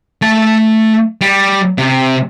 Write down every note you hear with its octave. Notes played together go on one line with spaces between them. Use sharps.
A3 A5
G3
C3